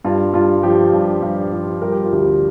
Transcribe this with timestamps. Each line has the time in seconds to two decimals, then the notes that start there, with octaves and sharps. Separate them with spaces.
0.05 G2 F4
0.34 G2 F4
0.63 F3 G4
0.93 G2
1.22 G2
1.52 F3
1.82 G3 A#4
1.92 G4
2.03 F4
2.12 D2 G4